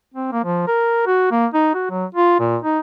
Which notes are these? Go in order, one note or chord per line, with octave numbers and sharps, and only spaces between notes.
C4
A#3
F3
A#4
F#4
A#3
D#4
F#4
F#3
F4
A#2
D#4